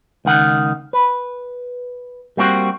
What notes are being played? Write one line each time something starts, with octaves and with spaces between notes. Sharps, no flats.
C#2 D#3 F#5
B4
G3 A#3 C4 F4 F#4